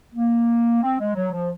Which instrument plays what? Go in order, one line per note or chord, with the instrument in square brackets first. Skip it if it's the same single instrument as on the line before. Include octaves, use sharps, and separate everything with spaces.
[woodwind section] A#3
C4
G#3
F#3
F3